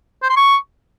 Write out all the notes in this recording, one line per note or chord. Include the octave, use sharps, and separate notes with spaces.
C5
C6
C#6